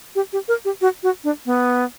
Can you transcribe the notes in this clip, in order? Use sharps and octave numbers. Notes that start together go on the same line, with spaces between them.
G4
G4
A#4
G4
F#4
F#4
D4
B3